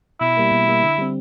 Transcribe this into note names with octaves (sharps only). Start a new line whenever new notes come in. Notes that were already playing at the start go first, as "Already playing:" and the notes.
B2 E4
G3 A#3
B2
G3 A#3
D3
G3 C4